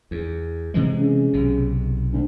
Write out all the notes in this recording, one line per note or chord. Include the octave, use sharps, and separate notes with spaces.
E2
C3 E3 G#3
C#3
B1 C3
D2